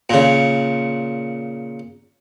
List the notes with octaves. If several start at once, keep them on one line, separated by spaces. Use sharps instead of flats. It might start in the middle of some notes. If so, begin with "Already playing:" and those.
A#2 C#3